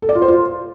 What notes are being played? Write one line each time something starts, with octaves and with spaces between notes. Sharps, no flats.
A4
D5
F4
C5
F4